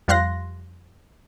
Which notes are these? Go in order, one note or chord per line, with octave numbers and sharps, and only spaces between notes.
F2 G3 F5 C6 F#6 A#6